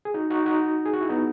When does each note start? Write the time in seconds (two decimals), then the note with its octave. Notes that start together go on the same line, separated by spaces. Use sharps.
0.05 G#4
0.14 D#4 F#4
0.30 D#4 F#4
0.46 D#4 F#4
0.86 G#4
0.93 F#4
1.01 E4
1.09 B3 D#4